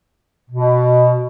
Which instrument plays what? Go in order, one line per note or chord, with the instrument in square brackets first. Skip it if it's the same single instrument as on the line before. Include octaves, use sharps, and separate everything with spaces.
[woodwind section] B2